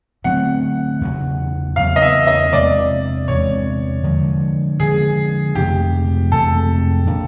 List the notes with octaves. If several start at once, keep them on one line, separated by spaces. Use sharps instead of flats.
D3 F#3 A3 C4 F#5
E2 C#3 F#3
E2 C#3 F#3 F5
D#5
E5
D#5
E2 C3 E3 G#3 D5
E2 C3 E3 G#3 C#5
D3 F3 G#3
D3 F3 G#3 G#4
F2 C3 E3 A3 G4
F2 C3 E3 A3 A4
A#2 F#3 A#3 D4